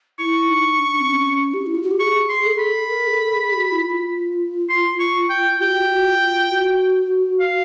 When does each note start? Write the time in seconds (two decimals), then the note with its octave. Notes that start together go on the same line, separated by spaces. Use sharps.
0.19 E4 C#6
0.49 D#4
0.79 D4
1.00 C4
1.09 C#4
1.54 G4
1.66 E4
1.75 F4
1.83 F#4
1.91 G4
2.00 G#4 C#6
2.29 C6
2.45 A4
2.53 G#4
2.59 A4 B5
2.89 A#4
3.07 G#4
3.12 A4
3.35 G#4
3.52 G4
3.57 F#4
3.72 E4
3.80 F4
4.70 C6
5.00 C#6
5.30 G5
5.61 G4 G5
5.69 F#4
5.78 F4
5.87 F#4
6.06 F4
6.50 F#4
7.40 F5